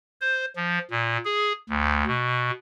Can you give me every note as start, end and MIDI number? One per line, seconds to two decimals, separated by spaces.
0.21 0.45 72
0.56 0.79 53
0.90 1.17 46
1.25 1.52 68
1.70 2.04 38
2.07 2.51 47